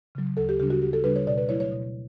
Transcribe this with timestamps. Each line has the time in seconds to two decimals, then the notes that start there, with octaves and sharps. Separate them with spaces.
0.15 C#3 F#3
0.37 D2 A4
0.49 G4
0.60 C#3 G3 D4 G4
0.70 F#4
0.82 D2 G4
0.93 A4
1.04 C#3 G3 D4 B4
1.16 C#5
1.27 B2 D5
1.38 B4
1.49 F#3 A3 E4 C#5
1.60 C#5
1.71 B2